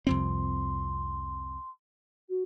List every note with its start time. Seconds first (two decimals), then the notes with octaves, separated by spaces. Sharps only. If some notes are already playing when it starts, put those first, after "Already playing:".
0.07 C2 F2 C4 C6
2.29 F#4